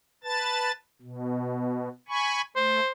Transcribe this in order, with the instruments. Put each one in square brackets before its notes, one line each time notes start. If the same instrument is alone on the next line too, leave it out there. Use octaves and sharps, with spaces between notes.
[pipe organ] B4 A5 A6
B2
G#5 B5 C#6
[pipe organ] A3 [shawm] C5